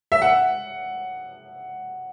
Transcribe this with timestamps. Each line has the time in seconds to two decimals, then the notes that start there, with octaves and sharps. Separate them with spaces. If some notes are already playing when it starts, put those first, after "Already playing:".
0.12 E5
0.22 F#5